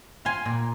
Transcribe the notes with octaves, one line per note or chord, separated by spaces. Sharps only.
F4 G#5 C6
A#2